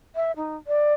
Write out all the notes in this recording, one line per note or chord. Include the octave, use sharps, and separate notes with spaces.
E5
D#4
D5